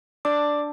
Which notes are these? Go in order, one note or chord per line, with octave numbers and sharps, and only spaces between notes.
D4 D5 D6